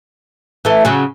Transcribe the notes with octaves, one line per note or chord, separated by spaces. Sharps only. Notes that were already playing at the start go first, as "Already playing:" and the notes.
E3 A3
C#3 F#3